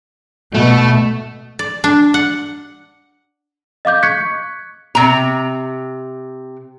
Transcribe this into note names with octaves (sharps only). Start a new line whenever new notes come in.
B2 A3
D5
D4
F#5
D#5 F5 D6 G6
C#6 F#6 G#6 B6 C#7
C3 A#5